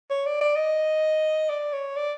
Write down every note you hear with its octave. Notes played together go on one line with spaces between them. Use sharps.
C#5
D5
D5
D#5
D5
C#5
D5